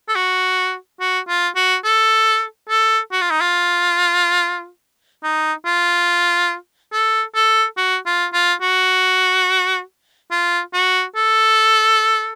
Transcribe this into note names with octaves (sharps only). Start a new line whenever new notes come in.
A4
F#4
F#4
F4
F#4
A4
A4
F#4
F4
D#4
F4
D#4
F4
A4
A4
F#4
F4
F4
F#4
F4
F#4
A4